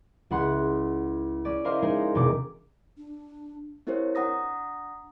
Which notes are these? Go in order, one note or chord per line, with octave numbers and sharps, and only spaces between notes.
C#2 E4 F#5 C6 F#6
C#4 D5
E4 A#4 C5 D#5 F5 D6
G#3 D#4 G#4 A#4 C5
E1 C3 D6
D4
C4 E4 G4 A#4 C5 C#5
D4 F#5 A#5 D#6 A#6